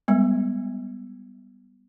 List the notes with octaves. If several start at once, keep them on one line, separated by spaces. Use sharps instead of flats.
G3 G#3 B3